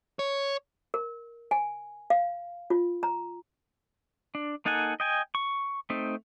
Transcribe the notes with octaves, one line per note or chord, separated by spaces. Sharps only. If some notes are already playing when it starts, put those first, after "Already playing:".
C#5
A#4
G#5
F5
F4
A#5
D4
A#3 D#4 A4 F#5 G#5
D#5 G5 G#5
C#6
A3 C4 D#4